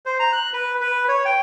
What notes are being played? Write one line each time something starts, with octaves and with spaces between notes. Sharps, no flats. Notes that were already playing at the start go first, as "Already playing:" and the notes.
C5
A#5
F#6
B4
B4
C#5
G5